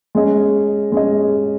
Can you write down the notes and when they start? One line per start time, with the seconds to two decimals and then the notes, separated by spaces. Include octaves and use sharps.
0.15 G#3 C#4 G#4 D#5
0.92 G#3 C#4 G#4 D#5